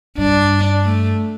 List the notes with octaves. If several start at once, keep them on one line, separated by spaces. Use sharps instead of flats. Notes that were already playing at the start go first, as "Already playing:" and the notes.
G2 D4
A3